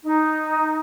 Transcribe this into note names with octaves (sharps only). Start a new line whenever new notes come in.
D#4